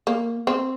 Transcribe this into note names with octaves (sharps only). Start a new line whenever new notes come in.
A#3
C4